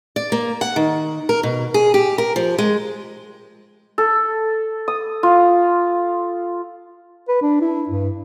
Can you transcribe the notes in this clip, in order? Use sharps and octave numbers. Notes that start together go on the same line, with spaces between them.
D5
A#3
F#5
D#3
A#4
B2
G#4
G4
A#4
F3
G#3
A4
D#6
F4
B4
D4
E4
G2